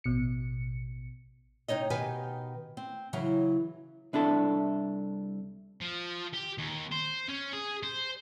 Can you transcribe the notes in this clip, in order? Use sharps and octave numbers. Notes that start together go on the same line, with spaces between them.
A1 B2 C#7
C3 E3 D#4 C#5 D#5
B2 D#3 G4 B4 G#5
C4
C#3 E3 F#3
C2 D4 E4 A4
F3
G4
D#2
C5
C#4
G#4
C5